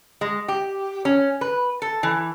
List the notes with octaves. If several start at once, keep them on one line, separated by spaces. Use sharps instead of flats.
G#3
G4
C#4
B4
A4
E3